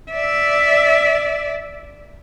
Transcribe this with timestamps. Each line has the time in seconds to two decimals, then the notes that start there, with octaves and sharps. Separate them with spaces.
0.12 D5 E5